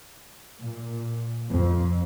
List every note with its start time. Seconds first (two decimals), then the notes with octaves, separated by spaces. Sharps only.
0.60 A#2
1.50 F2